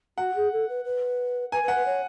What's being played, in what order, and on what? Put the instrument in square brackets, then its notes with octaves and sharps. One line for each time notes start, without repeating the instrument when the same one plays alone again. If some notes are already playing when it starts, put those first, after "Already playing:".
[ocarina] F#4 [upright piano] F#5
[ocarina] G#4
A4
B4
B4
[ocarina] B4 [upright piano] G#5
[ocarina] B4
[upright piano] F#5
[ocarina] B4
C#5